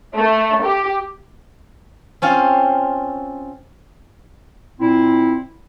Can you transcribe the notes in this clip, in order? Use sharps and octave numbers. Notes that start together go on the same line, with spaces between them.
A3
G4
C4 C#4 F4
A#2 C4 E4